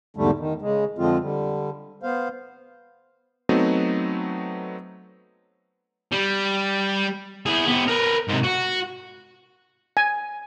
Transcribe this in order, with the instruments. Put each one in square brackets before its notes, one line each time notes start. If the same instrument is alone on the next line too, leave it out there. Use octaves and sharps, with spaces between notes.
[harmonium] E2 G#2 D3 G3 A3
D#3
C#3 G#3
F2 D3 F3 G#3 C4 F4
D3 G3
B3 C5 F5
[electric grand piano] F#3 A3 B3 C4 D#4
[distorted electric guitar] G3
E4 G#4
B3 G4
A#4 B4
G#2 C3
F#4
[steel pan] G#5